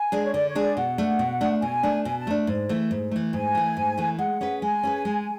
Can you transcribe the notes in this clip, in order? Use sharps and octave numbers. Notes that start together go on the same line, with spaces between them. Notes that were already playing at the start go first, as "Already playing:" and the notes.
Already playing: G#5
G#3 D4 G#4
C#5
D3 D5
C#5
G#3 D4 G#4
D5
B2 F#5
A3 D4
B2
A3 D4
B2 G#5
A3 D4
B2 G#5
A5
A3 D4
G#2
E3 A3
G#2
E3 A3
G#2 G#5
E3 A3
G#2
E3 A3
G#3 F#5
C#4 G#4 B4
G#3 G#5
C#4 G#4 B4
G#3